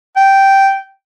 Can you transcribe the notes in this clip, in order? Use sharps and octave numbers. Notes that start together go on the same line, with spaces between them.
G5